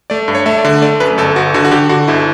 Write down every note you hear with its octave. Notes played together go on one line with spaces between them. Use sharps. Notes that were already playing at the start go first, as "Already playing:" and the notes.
A3 D5
G2
C#5
A3 E5
D5
D3
A3 D5
F#2 B4
G1 A4
G1 F#4
D3 F#4
F#4
D3 G4
D3 F#4
G1 E4